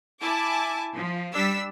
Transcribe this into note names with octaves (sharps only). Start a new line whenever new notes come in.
E4 G#5 A5 D6
F3
G3 D4 E6 B6